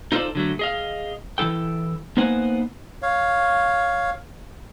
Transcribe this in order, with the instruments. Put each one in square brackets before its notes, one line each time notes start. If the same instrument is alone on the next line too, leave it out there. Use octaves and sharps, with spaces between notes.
[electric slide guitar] D#4 F4 A4 B4 C5 D5
D3 F#3 A3
G#4 D#5 F5
E3 G#3 E4 A4 G5
A#3 B3 D#4 C5 F#5 G#5
[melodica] C#5 F5